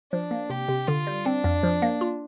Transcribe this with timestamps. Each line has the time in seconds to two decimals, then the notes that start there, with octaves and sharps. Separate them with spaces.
0.13 F3 D4
0.31 A#3
0.50 C3 G4
0.68 C3
0.88 D3 F4
1.07 G3
1.26 C4 D4
1.44 F2
1.63 F3
1.82 A#3
2.01 F4